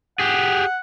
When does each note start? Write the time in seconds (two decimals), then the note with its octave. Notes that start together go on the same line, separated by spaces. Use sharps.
0.19 G4 G#4 F#5